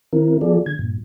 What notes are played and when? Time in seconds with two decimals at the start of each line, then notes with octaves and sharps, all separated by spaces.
0.13 D#3 C4 E4 A#4
0.41 F3 B3 F4 G#4 A4 D5
0.66 D3 G#6
0.79 G2 A#2